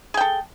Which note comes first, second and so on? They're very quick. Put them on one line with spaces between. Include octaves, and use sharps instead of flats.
G#4 G5 A4